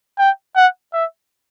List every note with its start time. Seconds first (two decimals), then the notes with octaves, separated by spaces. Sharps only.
0.19 G5
0.56 F#5
0.93 E5